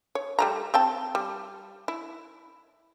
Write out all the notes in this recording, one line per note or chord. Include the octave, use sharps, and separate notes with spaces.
C#5
G3 A3 A#5
C4 G5 A5
G3
E4